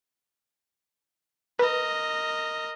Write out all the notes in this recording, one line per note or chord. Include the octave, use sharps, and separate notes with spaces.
A#4 B4 D#5